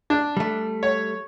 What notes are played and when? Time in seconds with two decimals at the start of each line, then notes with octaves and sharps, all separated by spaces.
0.10 D4
0.37 G3 A3
0.83 C#5